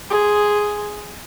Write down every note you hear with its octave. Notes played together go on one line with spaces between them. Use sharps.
G#4 C6